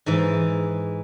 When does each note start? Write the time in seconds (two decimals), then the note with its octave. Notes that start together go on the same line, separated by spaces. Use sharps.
0.06 G#2 E3